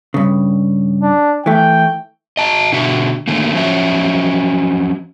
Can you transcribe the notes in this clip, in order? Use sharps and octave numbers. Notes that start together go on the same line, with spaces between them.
G2 C#3
D4
E3 A3 G5
D#5 A5 A#5
B2 D3 F#4 E5
D3 D#3 A3 A#3
F3 F#3 C#4 E5